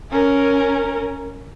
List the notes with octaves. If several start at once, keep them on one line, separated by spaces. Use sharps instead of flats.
C#4 A#4